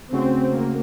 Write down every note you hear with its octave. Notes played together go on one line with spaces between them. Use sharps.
C#3 A3 C4 C#4 F#4
A#3